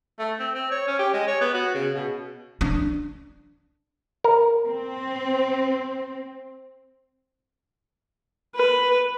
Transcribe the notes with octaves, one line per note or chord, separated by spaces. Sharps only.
A3
C4
C4
C#5
C#4
G4
G#3
C#5
B3
F#4
C#3
B2
D4
A#4
C4
B4